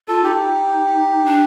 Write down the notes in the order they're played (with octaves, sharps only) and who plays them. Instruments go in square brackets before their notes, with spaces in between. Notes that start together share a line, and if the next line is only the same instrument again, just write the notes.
[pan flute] F4 [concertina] A4
[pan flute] D#4 [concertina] G4
[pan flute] D4